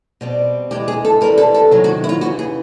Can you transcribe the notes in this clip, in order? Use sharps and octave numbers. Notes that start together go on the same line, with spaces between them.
B2 G3 C4
E2 B2 G#3 G4
G#4
A4
E2 B2 G3 C4 A#4
A4
A4
C3 D#3 F#3 G#4
F#4
E4
F4
D#2 C#3 E3 F#4
G#4